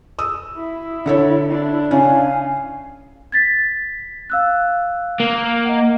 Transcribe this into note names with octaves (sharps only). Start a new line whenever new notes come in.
D#6 E6
E4
D3 A4 C#5
D4 E4
C#3 C#4 F5 G#5
G#6 A6 B6
F5 E6 F#6
A#3
D#5 F#5